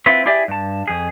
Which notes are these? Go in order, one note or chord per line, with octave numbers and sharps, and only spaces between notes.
C4 E4 F4 B4
E4 G4 G#4 D5 E5
G2 A5
F2 G#4